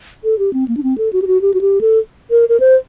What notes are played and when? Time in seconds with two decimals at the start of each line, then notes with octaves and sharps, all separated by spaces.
0.24 A4
0.39 G4
0.53 C4
0.68 A#3
0.77 D4
0.83 C4
0.98 A4
1.13 F#4
1.22 G4
1.27 F#4
1.41 G4
1.54 F#4
1.61 G4
1.81 A4
2.31 A#4
2.49 A#4
2.60 C5